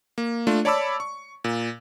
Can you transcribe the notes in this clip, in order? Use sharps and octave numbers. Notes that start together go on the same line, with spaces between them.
A#3
A3 D4 F4
C#5 D5 A5 B5 D6 E6
C#6
A#2